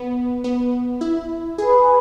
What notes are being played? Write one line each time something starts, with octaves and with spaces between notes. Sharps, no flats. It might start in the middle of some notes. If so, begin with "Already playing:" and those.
Already playing: B3
B3
E4
G#4 B4 G#5 B5